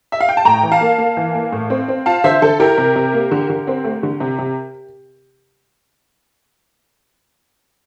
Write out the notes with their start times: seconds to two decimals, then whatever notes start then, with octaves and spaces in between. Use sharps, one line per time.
0.12 E5
0.20 F5
0.29 G5
0.37 A5
0.45 A2 G5 A#5
0.63 E3
0.72 F5 A5
0.81 A#3
0.98 A#3
1.17 E3
1.35 A#3
1.52 A2
1.70 C4
1.88 C4
2.06 F4 F5 A5
2.24 D3 C5 E5
2.42 D3 A4
2.59 E4 G4 A#4
2.78 C3
2.96 C3
3.14 A#3
3.31 D3
3.50 D3
3.67 C4
3.84 A3
4.03 D3
4.20 C3
4.39 C3